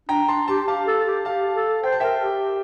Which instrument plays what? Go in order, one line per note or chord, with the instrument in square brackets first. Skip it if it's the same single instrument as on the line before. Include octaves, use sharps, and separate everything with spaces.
[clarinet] D4 [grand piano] G5 A#5
[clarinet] D4 [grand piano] A5 C6
[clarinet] G4 [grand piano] A5 C6
[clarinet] G4 [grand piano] F5 A5
[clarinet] A4
G4
[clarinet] G4 [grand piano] F5 A5
[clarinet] A4
[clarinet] C5 [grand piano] G5
[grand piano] A5
[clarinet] A#4 [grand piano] E5 G5
[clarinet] G4